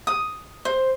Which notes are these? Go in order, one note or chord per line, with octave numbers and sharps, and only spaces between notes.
D#6
C5